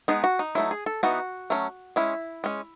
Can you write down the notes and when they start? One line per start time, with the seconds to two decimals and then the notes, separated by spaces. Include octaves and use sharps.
0.08 G#3 B3 D#4 G#4
0.24 F#4
0.39 D#4
0.55 F#3 A3 D#4 E4
0.71 G#4
0.86 A4
1.03 E3 B3 D#4 F#4
1.50 F#3 A3 C#4
1.96 G#3 C#4 E4
2.44 G#3 C#4